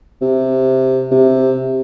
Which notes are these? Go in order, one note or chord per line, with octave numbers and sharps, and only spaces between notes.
C3
C3